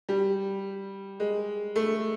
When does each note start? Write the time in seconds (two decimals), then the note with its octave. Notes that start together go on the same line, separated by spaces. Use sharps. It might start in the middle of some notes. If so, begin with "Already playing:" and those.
0.09 G3
1.20 G#3
1.76 A3